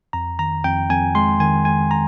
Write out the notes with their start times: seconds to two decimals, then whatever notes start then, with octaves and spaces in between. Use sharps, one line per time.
0.13 F2 A#5
0.39 D#3 A#5
0.64 F2 G5
0.89 F2 G#5
1.15 G#3 C6
1.40 D#3 G#5
1.65 G#3 G#5
1.91 A#5